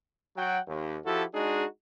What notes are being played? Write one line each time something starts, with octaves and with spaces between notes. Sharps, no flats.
F#3 F#4 F#5 G5
D#2
F3 E4 F#4 G4 A4
G#3 D4 D#4 F#4 G#4